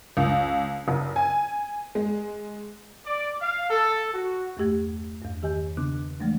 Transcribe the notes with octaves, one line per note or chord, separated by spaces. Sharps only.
C#2
F#1
G#5
G#3
D5
F5
A4
F#4
E2 G2 A3 G4 G#6
E2 G2
D#3 G4 D#5 G#5 G6
E2 C#3 B3 D4 D6 F#6
E3 F3 G#3 A3 D4